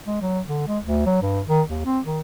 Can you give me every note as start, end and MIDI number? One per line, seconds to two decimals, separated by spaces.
0.06 0.18 56
0.21 0.40 54
0.47 0.63 50
0.68 0.79 56
0.84 1.04 38
1.06 1.20 54
1.22 1.41 43
1.47 1.62 51
1.69 1.83 39
1.85 2.00 60
2.06 2.20 51